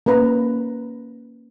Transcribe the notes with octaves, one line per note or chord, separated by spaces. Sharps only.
A#3 C#4 B4 A#5